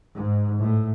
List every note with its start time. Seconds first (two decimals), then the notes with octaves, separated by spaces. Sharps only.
0.12 G#2
0.60 A2